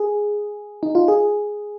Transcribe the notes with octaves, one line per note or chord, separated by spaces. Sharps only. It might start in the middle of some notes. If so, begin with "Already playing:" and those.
Already playing: G#4
D#4
F4
G#4